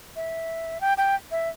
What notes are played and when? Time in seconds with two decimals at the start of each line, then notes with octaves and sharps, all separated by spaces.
0.16 E5
0.81 G5
0.98 G5
1.31 E5